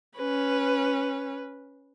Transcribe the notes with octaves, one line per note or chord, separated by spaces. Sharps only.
C#4 B4